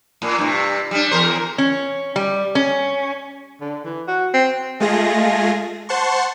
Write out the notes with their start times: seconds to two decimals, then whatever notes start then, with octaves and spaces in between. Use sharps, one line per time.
0.22 A2
0.39 G2 C3
0.91 G3 D4
1.11 E2 A#4 C5
1.58 C#4
2.16 G3
2.55 C#4
3.61 D3
3.85 E3
4.08 F#4
4.34 C4
4.80 G#3 A3 F4 G#4 A#6
5.89 C5 F#5 A5 C6 C#6